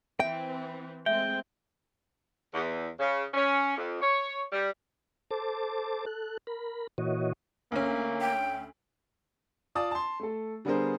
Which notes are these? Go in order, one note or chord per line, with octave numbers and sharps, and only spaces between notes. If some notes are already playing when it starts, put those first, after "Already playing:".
E3 C4 E5 G5
G#3 A3 C4 E5 G5
E2
C#3
C#4
F2
C#5
G3
A4 C5 A5 D6
A4 F#6
A#4 B5
A#2 E3 F#4 C#5 D#5
D2 A#3 C#4
G5
F4 D5 A5 D#6
A5 C6
A3 A4
D3 G3 B3 G#4 A#4 C5